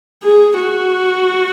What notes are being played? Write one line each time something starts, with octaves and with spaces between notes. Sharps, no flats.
G#4
F#4